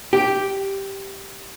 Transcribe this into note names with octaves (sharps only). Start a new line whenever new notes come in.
G4